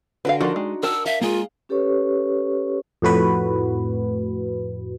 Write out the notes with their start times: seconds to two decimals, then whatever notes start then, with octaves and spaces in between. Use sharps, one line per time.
0.25 D3 F#4 B4 F5
0.41 F3 D4 D#4 F#4 A#4 D5 C6
0.56 G#3
0.83 A#4 F#5 A5 D6 E6
1.06 E5 F5
1.21 G#3 A#3 F4
1.69 C#4 G4 A4 B4 C#5 C#6
3.02 F2 A2 F#4 B4